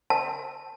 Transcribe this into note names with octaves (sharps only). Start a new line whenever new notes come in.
A5